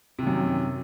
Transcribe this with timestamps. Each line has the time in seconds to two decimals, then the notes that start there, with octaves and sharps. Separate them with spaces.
0.19 C3
0.23 D#3
0.27 F#2